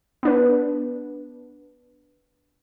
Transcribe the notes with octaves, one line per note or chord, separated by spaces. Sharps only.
B3 D4 B4